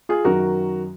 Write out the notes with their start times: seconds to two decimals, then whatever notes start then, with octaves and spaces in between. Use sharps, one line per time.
0.09 F4 G#4
0.25 F#2 D#3 F#3 F#4 A#4